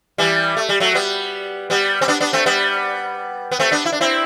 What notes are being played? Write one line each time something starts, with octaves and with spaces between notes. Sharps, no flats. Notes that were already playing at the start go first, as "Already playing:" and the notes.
E3 G3
A3
G3
F#3 A3
G3 B3
G3 B3
C4
B3 D4
B3 D4
A3 C4
G3 B3
B3
A3 C4
B3 D4
E4
D4
C4 E4